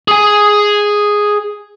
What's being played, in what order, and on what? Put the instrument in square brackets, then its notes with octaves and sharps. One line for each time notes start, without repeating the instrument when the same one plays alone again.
[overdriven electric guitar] G#4 G#5